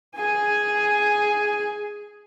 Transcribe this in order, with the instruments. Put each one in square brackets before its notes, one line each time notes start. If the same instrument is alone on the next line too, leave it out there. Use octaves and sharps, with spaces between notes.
[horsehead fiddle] G#4 G#5